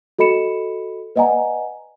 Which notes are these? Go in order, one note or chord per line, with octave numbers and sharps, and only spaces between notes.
F#4 A4 D#5 B5 C#7 E7
B4 D5 D#5 F#5 G#5 A#5